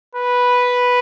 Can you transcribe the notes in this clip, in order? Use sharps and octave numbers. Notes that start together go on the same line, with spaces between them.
B4